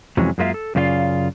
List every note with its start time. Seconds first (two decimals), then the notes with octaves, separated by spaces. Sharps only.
0.17 F2 C3 E3 F#3 G#3 C#4
0.38 F#2 G#3 A#3 F4 E5 F5
0.54 A4
0.75 F#2 C#3 C4 F4 D5 F5